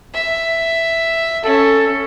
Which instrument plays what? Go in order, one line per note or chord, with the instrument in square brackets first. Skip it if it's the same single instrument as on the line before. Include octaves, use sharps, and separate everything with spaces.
[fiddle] E5
[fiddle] C#4 [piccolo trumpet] A4